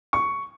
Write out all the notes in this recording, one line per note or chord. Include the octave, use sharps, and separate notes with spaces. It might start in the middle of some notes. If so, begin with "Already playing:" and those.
C#6